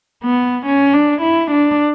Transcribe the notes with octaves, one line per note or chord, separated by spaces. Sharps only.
B3
C#4
D4
E4
D4